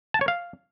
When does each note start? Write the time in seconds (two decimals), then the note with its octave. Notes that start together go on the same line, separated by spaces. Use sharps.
0.14 A5
0.21 C#5
0.28 F5